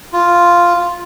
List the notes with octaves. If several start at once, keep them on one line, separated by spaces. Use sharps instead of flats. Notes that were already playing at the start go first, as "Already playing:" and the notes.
F4